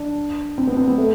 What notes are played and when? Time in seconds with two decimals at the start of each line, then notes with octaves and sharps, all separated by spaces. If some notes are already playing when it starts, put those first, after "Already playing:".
Already playing: D4
0.58 C4
0.67 B3
0.77 C4
0.88 B3
0.98 A3